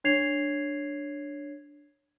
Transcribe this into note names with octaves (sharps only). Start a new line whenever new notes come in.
D4 C#5 G#6 C7 F7